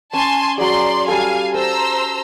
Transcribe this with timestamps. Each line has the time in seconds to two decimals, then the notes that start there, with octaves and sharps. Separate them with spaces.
0.13 C#4 G#5 A5 C6
0.58 F#3 G#4 D5 C6
1.08 G3 A4 F5 G#5
1.54 A4 C5 A#5 E6